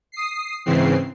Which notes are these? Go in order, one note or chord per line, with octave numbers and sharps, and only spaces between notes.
D#6 C7
G#2 C#3 E3 C4 C7